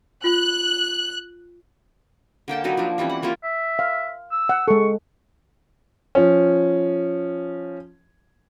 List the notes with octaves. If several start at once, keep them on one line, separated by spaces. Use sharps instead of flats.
F4 F#6
D3 A#3 G5 A5
F#3 A#3 D#4 B4
F3 A#3 D4
E3 G3 C4 C#4
F#5
G3 A#3 C#4 F4
E5
F5
E6
F#5
G#3 A4 C#6
F3 C#4